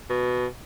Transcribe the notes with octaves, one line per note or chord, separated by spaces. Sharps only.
B2